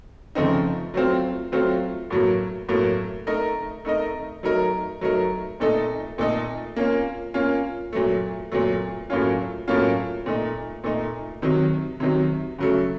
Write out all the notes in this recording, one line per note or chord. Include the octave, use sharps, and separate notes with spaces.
C#3 F3 A3 C4 D#4
F#3 A3 C4 F4
F#3 A3 C4 F4
A2 F#3 A#3
A2 F#3 A#3
A3 D#4 A#4 D#5
A3 D#4 A#4 D#5
F#3 A3 D#4 A#4
F#3 A3 D#4 A#4
A#2 A3 D#4 A4 D#5
A#2 A3 D#4 A4 D#5
A#3 C#4 F4
A#3 C#4 F4
A#2 F#3 A3
A#2 F#3 A3
A2 F#3 A#3 C#4 F4
A2 F#3 A#3 C#4 F4
A#2 A3 D#4
A#2 A3 D#4
C3 D#3 F#3
C3 D#3 F#3
C#3 F#3 A3